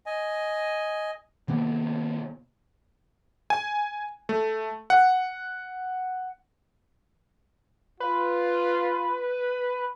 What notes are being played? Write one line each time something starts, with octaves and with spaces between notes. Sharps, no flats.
D#5 G#5
C3 D#3 A#3 B3
G#5
A3
F#5
F4 B4